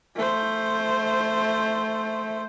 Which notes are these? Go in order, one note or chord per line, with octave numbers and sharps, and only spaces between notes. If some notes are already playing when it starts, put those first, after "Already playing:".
A3 C5